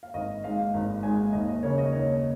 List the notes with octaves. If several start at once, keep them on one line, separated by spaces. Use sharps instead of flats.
F5
G#1 D#5
G#2 G#3 F5
G#1
G#2 G#3 G#5
D#2 D#5
D#5
C#3 A#3 C#5
D#5
D#2 C#5